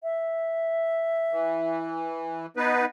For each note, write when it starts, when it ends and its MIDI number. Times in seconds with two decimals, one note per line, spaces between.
0.03 1.79 76
1.32 2.46 52
2.57 2.85 59
2.57 2.85 63
2.57 2.85 71